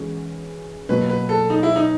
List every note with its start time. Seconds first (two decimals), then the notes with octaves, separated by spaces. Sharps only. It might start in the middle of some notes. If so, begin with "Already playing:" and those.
Already playing: E3 G#3 C#4 F#4
0.89 B2 F#3 A#3 B4
1.10 B4
1.29 A4
1.50 D#4
1.63 E4
1.76 D#4